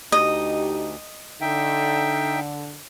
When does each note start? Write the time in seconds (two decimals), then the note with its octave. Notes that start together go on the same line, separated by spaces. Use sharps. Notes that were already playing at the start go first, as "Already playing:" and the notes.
0.12 D2 D#4 G4 D#5
1.41 D3 D#4 E5 G5